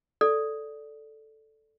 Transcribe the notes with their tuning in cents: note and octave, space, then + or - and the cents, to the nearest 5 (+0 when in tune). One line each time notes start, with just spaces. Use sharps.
A4 +0 D5 -5